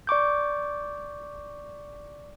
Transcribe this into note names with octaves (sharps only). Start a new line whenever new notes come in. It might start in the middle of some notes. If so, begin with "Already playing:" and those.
D5 C#6 D6 G6